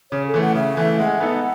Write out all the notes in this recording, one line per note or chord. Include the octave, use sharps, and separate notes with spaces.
C#3 C#5
A4
E3 A3
F#5
C#3 E5
E3 A3
G#3 F#5
B3 D#4 A4